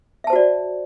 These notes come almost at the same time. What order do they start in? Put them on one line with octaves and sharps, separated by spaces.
E5 A5 C5 F#4 D5